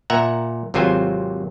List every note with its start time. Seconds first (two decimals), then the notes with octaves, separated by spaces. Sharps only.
0.10 A#2 E5 F#5 A#5
0.74 G#1 C3 F#3 F4 C5 G#5